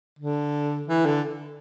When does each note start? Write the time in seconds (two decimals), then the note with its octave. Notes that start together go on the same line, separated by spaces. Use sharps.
0.19 D3
0.88 E3
1.06 D3